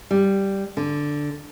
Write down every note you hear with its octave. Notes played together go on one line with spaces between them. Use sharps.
G3
D3